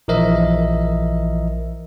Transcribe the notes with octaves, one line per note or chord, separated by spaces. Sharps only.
A#1 E3 F3 A#4 D#5 E5